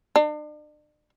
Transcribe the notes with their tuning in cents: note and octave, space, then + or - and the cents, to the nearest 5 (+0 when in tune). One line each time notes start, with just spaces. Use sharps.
D4 +40